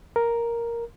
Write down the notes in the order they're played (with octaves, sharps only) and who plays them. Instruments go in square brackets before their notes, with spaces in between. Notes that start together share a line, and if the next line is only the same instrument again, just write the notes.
[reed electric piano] A#4